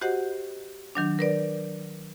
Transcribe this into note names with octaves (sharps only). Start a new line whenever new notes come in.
F#4 G4 C5 D#5 F#5
D#3 F#3 D4
A#4 B4 D5